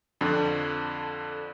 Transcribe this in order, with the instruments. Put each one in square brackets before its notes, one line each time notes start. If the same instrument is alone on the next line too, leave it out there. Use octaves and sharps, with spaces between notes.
[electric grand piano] F2 D3